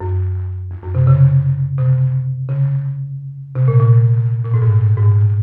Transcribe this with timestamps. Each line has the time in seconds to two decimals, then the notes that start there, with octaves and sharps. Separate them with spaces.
0.01 F#2
0.71 F2
0.83 F#2
0.95 C3
1.07 C#3
1.78 C3
2.49 C#3
3.55 C3
3.68 A#2
3.80 A#2
4.44 A#2
4.54 A2
4.62 G#2
4.98 G#2